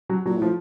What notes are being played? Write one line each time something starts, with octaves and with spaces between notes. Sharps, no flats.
F#3
A#2 F#3
A2 F3